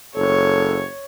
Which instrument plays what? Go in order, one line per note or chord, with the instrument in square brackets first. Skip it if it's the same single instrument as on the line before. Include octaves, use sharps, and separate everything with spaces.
[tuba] F#1 [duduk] A4 [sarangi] C#5